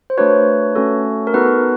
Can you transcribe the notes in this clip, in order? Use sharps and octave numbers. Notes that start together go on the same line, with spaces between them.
C5
A3 D4 F#4 B4 C#5
A3 C#4 F#4 A4
A#4
B3 D#4 F#4 A4 B4